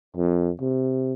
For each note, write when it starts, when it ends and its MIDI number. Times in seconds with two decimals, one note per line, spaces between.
0.17 0.50 41
0.61 1.14 48